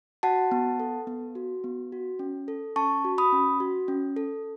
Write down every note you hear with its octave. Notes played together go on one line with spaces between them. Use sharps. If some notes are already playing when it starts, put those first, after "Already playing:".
F#4 F#5 A5
B3
A4
B3
F#4
B3
F#4
C#4
A4
C#4 A5 C#6
F#4
B5 D#6
C#4
F#4
C#4
A4